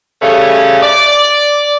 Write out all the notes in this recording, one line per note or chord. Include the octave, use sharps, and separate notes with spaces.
C#3 G3 A3 C#4
D5